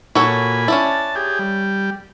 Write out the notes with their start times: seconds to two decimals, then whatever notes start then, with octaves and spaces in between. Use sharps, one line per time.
0.15 A#2 F#4 A4 C#5 G#5 B5
0.68 C#4 D4 E4 A5
1.15 G4 G#4
1.39 G3